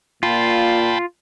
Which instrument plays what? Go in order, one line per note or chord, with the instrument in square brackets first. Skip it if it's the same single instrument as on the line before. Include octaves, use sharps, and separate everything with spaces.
[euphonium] A#2 [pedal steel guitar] F4 [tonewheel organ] G5 A5 B5